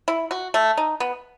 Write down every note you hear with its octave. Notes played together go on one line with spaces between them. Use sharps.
E4
F#4
A3
D#4
B3